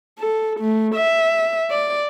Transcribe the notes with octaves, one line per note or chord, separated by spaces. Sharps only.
A4
A3
E5
D5